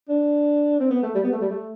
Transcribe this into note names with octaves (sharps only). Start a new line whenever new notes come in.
D4
C4
B3
A3
G3
B3
A3
G3
A3